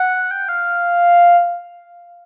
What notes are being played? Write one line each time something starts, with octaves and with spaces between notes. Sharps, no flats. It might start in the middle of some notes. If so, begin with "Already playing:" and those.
Already playing: F#5
G5
F5